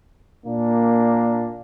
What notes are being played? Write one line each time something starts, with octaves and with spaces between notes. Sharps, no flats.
A#2 A#3 D4